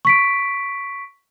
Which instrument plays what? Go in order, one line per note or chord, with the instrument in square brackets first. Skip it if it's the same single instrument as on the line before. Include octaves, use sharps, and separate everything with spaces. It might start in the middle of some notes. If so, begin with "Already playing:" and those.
[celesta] C#6 B6 D7